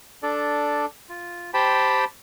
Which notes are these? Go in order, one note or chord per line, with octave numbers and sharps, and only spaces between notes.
D4 A4 D5
F4
G4 C5 G5 A5 B5